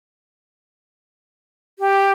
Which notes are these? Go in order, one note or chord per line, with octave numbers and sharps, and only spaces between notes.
G4